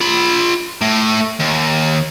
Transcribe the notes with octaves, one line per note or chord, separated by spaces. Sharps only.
F4 B5
A2
D#2